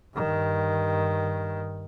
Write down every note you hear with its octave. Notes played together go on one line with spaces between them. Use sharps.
G2 D#3